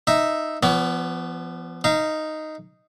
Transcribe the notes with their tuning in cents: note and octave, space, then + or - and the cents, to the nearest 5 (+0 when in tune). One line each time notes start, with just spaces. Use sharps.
D#4 +0 E5 +0
F3 -30 B3 +15 C#5 +45
D#4 +0 F5 -30